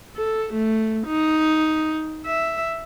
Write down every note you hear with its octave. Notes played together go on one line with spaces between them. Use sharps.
A4
A3
D#4
E5